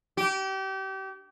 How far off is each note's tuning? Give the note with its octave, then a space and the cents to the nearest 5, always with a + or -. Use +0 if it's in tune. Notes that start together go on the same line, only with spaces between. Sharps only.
G4 -30